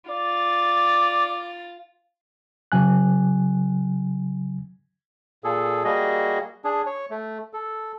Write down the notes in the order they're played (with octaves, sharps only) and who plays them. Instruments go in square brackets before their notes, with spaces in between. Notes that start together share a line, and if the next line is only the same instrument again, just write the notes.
[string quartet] F4 A6 [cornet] D5
[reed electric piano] C#3 F#3 G#5 F#6
[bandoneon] A#2 G#4 A4
G3 A#3 F#4 G#4 D#5
D4 G#4
C#5
A3
A4